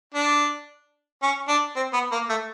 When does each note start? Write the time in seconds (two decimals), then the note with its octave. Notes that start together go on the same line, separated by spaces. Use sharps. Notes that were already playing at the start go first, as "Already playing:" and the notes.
0.14 D4
1.22 C#4
1.48 D4
1.76 C4
1.93 B3
2.12 A#3
2.29 A3